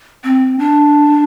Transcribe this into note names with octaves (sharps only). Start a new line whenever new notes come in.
C4
D4